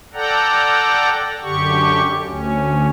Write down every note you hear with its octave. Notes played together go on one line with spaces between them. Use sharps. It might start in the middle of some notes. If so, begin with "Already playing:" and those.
A4 D5 F#5 G5 A#5
F#2 D3 G4 C#6
D2 C#4